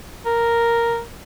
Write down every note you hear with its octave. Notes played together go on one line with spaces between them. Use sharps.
A#4